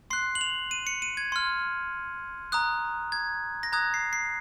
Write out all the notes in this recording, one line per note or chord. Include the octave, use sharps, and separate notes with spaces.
C6 F#6 C7
F#7
F7
D#7
C#7
D#7
G#6
C6 F6
A#5 D#6 F#6
G#6
A#6
A#5 D#6 F#6 G#6
C7
C7